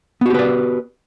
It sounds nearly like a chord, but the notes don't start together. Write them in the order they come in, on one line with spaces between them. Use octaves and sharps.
B3 F#4 G4 B4 D5